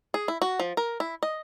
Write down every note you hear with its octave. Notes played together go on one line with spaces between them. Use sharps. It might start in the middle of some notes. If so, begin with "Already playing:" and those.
G#4
E4
F#4
F3
A#4
E4
D#5